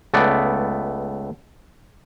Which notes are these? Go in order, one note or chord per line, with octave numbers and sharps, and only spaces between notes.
C#2 A3 B3 D5